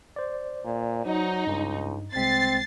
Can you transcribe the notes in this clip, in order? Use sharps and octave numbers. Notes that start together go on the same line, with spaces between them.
C5 D5
A#2
F#3 D#4
C#2 G2
C2 G#3 C4 A6 B6 C7